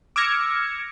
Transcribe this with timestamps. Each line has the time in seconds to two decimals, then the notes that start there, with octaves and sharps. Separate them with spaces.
0.16 D6 E6 F6 G#6 A#6 C#7